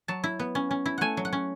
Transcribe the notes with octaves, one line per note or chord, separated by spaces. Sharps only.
F#3 A5
E4
B3
C#4
C#4
E4
A3 F#5 G#5
F#3
F#5
C#4